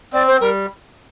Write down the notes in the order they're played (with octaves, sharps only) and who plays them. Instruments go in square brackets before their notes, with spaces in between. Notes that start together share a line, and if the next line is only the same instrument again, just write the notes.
[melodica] C4 [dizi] D5
[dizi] C5
[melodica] G3 [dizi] A#4